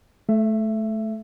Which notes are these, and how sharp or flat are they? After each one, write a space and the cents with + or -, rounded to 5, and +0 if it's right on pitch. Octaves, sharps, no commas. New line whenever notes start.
A3 -20 E5 +15